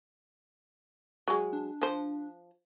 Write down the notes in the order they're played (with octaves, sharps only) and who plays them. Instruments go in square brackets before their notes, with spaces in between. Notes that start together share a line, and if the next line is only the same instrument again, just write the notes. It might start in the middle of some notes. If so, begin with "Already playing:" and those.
[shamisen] F#3 G#3
[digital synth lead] D4
[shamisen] F3 C5